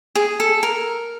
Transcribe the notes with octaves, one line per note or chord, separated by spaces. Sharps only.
G#4
A4
A#4